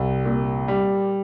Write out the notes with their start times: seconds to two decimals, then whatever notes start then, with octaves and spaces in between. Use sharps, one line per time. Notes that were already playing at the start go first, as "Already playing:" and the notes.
Already playing: C2
0.25 A#2
0.68 G3